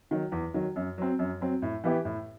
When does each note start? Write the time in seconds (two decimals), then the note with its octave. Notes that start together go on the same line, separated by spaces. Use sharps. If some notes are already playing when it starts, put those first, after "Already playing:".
0.11 D#3 F#3
0.32 E2
0.54 D#3 F#3
0.76 F#2
0.98 F#3 C4
1.19 F#2
1.41 F#3 C4
1.62 A2
1.84 E3 B3 E4 G4
2.05 A2